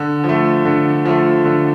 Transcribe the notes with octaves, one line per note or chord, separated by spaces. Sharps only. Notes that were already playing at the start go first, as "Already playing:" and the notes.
Already playing: D3
F3
A3
D3
F3 A3
D3